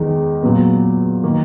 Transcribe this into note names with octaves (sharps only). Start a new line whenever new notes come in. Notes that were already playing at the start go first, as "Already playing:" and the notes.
Already playing: E2 D#3 G#3 D#4
A#2 F#3 B3
D#3 A#3